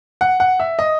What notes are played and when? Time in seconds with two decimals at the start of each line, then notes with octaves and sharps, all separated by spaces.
0.21 F#5
0.40 F#5
0.60 E5
0.79 D#5